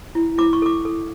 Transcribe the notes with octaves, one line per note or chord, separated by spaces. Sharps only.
E4
E4 D6
C#6
A4 D6
A4